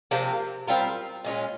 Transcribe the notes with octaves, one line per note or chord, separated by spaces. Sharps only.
C3 F3 A#3
G3 C4 F4 A#4
A#2 G#3 C#4 F4